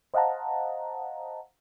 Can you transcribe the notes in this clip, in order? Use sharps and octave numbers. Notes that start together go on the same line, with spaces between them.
C5 D#5 F5 F#5 A5 A#5